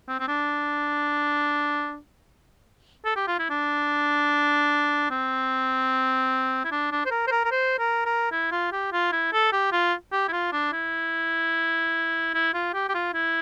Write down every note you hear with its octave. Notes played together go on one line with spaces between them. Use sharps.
C4
C4
D4
A4
G4
F4
E4
D4
C4
E4
D4
D4
C5
A#4
C5
A#4
A#4
C5
A#4
A#4
E4
F4
G4
F4
E4
A4
G4
F4
G4
E4
F4
D4
E4
E4
F4
G4
G4
F4
E4